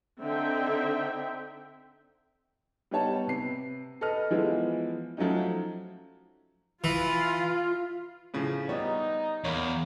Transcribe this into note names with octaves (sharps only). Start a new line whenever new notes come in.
D3 C4 D#4 E5 G5
G3 B3 D#4 C#5 A5
C3 B4 C7
A4 B4 D#5 F6
E3 F3 G#3 B3
F3 F#3 A3 C#4 D#4
E3 F4
A2 C#3 F3
G3 B3 D#4 C#5
E2 A#3 C#5 B5